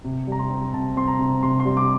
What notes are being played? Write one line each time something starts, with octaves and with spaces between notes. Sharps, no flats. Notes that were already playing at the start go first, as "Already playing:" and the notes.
C3
G3 A#5
C6
C4
C3 A5
C4 C6
A#5
C3
C3 C6
C6
G3
D6